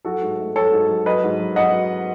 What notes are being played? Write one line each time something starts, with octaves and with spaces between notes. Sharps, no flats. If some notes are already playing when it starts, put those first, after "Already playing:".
F#3 F#4 A4
G#2
A3
F#3 A4 C#5
G#2
F#3
F#3 B4 D#5
G#2
F#3
F#3 D#5 F#5